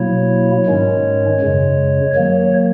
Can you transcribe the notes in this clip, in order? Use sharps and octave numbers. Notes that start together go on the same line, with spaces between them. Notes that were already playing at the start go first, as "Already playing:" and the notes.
Already playing: B2 F#3 A#3 E4 C#5
G#2 D#3 G#3 C#4
F#2 C#3 G#3
D#3 F#3 A#3 C#5